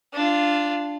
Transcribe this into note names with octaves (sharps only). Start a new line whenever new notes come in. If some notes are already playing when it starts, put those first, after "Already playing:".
D4 F4